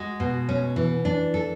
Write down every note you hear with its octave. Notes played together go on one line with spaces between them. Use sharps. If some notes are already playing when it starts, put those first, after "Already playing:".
Already playing: G#3 F#4
B2
C#4
E3
D4
A4